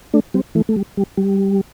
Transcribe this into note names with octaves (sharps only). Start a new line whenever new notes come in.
A3 D4
G3 C4
E3 A3
A3
G3
G3
G3